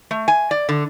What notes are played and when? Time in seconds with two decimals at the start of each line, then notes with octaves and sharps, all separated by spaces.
0.11 A3
0.28 G#5
0.51 D5
0.69 D3